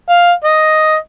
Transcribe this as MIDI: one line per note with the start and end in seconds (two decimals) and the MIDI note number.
0.10 0.32 77
0.44 0.96 75